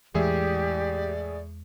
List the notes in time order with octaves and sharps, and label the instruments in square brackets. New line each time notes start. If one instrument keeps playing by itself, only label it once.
[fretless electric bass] E2 E3 G#3 [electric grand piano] A2 G#4 E5 [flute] G4 [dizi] D5